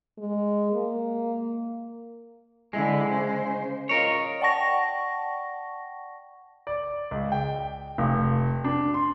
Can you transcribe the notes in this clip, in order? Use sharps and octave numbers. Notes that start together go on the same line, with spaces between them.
G#3
A#3
D3 G#3 E4
C#3 C5
F4 A#4 C#5 D#5
D5 F#5 G5 A5 C#6 A#6
D5
C#2
G5
F1
D4
C6